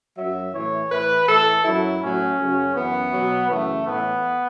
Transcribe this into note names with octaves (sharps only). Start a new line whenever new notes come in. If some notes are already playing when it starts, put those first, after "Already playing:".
F#2 F#3 E5
A2 E3 C#5
A2 E3 B4
A2 E3 A4
F#2 F#3 E4
A2 F#3 C#4
F#2 C#3 F#3
F#2 E3 B3
B2 F#3
F#2 C#3 E3 A3
A2 E3 B3